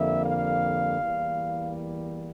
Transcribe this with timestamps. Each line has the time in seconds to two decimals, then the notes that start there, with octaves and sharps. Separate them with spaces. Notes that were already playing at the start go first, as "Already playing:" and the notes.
Already playing: F2 D3 G3 A#3 E5
0.23 F5
1.00 E2 E3 G3 A#3